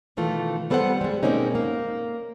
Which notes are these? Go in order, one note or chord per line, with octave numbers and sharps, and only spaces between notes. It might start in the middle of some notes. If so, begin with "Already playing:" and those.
B2 D#3 E3 A3 F4
G3 B3 A4 C5 D5 F#5
G3 G#3
B2 G#3 A#3 C4 C#4 D#4
A#3